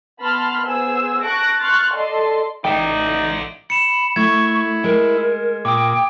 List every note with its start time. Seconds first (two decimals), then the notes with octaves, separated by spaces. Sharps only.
0.21 B3 A5 B5 C6 F6
0.64 B3 G#4 C5 E6
1.23 A5 C#6 F#6 A#6 D7
1.61 C6 C#6 F6 F#6 A6
1.93 A4 D5 D#5 A5 C6
2.65 A1 D#4 D5 E5 G5
3.70 B5 C#7 E7
4.16 A3 E4 C#6 G#6
4.84 G#3 A#4
5.65 A#2 G5 D6 D#6